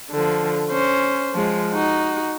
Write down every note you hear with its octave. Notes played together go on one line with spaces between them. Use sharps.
D3 F3
C#4 C5
F3 G#3
D#4 F#4